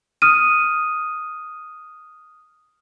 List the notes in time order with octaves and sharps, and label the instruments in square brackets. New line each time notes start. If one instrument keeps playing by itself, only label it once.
[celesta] D#6 F6 D#7